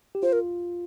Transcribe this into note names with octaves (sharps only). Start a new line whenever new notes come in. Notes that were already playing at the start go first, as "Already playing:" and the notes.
G4
F4 C5
A#4